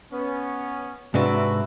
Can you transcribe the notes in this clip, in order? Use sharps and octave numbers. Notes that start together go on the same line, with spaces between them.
B3 C#4
G#2 C3 D4 F#4 B4 E5